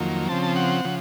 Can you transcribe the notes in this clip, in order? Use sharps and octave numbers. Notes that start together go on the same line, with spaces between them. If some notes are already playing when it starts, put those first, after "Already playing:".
Already playing: F2 D#3 F#3 A#3
C#3 F3 C4 A5
A5
F#5
C#3 F3